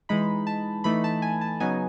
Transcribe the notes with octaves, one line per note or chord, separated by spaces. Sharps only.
E3 G#3 D#4 B5
A5
E3 A3 D#4 B5
A5
G#5
A5
C#3 F#3 B3 D#4 G#5